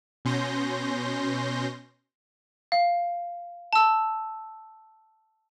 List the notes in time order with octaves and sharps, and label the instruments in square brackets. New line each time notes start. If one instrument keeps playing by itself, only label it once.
[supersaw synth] B2 C#4 C6 G6 A#6
[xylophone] F5
A5 E6